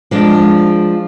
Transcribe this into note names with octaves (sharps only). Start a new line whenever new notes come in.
F3 G#3 D4